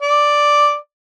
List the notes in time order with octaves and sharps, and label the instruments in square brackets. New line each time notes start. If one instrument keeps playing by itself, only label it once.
[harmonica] D5